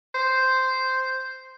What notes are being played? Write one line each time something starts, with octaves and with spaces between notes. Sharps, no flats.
C5